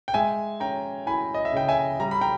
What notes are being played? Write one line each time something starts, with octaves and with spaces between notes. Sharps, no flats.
G5
G#3 E5 G#5
C#4 G5 A#5
E4 G#5 B5
D#5
E5
C#3 G5
E5 G#5
G3 A#5
B5
G5 A#5